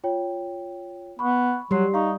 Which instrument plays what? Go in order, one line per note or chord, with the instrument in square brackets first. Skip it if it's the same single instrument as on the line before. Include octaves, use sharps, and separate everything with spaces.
[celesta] F4 C#5 G5
[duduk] B3 [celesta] B5 C#6
[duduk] F#3 [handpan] G3 [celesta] C6 C7
[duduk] D#4 [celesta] F5 C#6